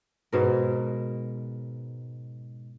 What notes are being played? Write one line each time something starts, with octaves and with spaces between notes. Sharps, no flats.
G#2 B2 A#4